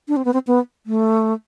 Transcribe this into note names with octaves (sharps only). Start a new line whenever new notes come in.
D4
C4
B3
C4
B3
A3